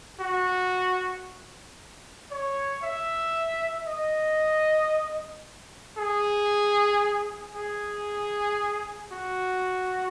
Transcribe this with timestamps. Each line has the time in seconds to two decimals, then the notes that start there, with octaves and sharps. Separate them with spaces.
0.20 F#4
2.31 C#5
2.83 E5
3.87 D#5
5.98 G#4
7.55 G#4
9.12 F#4